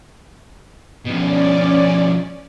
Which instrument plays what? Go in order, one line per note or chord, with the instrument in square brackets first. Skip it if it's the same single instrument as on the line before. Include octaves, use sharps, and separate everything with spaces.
[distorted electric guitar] B2 F3 [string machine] C#4 D5